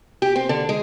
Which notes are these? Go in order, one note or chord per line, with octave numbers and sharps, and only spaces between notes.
G4
C4
D3
G#3